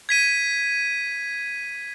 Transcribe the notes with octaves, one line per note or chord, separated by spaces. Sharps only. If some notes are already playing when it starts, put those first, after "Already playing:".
G#6 B6 D#7